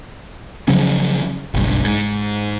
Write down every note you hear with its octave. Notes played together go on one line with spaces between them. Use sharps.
C#3 F3 F#3 C#4
F#1 B1 G2
G#2